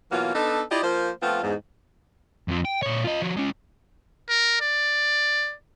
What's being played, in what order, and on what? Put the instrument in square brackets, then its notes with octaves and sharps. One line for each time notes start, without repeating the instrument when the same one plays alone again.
[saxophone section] B2 E3 F#3 A#3 B3 F4
B3 D4 D#4 A4
E4 F4 G4 D5 D#5
F3 A#3 C5
F3 A3 B3 C4 F4
E2 G#2
[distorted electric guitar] F2 F3
G5
A#2 C#5
F4 D#5
F3 F#4
G#3 C#4
[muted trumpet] A#4
D5